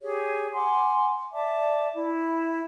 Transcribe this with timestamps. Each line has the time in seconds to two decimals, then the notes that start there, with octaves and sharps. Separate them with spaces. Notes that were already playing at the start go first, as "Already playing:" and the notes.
0.01 G4 G#4 C#5
0.53 F#5 G#5 C6 D6
1.32 D5 E5 A5 D6
1.95 E4